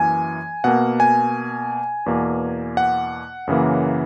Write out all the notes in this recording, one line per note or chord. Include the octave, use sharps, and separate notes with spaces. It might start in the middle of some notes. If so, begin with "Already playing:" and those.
Already playing: F#2 E3 A#3 G#5
B2 A#3 F#5
G#5
E2 B2 A#3
F#5
F#2 C#3 E3 A#3